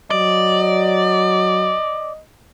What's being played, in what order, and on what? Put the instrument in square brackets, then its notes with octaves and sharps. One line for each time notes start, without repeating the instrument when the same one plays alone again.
[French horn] F#3 [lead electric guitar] D5 [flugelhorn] D#5